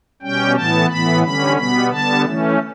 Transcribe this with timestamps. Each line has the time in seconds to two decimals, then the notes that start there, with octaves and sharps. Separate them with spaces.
0.22 B2 G3 C#4 G5
0.55 A2 E3 B3 A5
0.89 A2 E3 B3 B5
1.23 D3 G3 C#4 B5
1.56 B2 G3 B3 B5
1.91 D3 G3 B3 A5
2.25 E3 A3 C#4